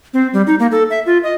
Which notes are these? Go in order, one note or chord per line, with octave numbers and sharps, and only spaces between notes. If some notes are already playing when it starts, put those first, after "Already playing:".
C4
G3
D#4
A#3
A4
E5
F4
D#5